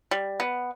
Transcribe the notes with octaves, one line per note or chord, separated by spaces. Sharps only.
G3
B3